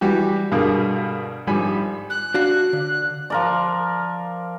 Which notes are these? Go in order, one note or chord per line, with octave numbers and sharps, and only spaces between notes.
E3 G3 F#4 G4
G2 B2 D3 G#4 A#4 F5
G#1 D3 F3 G3 G#5 B5
F#6
D4 F#4 F5
D3
F3 A#4 D5